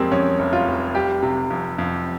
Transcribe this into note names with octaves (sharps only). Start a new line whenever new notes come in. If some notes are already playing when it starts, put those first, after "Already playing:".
Already playing: F2 G3 G#3 A#3 C4
F2 C#4
F1
F4
F1
G3 G4
C3
F2
F2